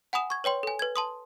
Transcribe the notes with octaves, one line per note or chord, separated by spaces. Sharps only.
F#5 G#5 B5 D#6 E7
C#6 G#6
B4 C#5 G5 C6
A4 G#5
B4 G#6
A5 C6 D#6